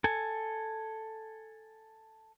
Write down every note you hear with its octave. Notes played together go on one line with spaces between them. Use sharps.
A4 G#5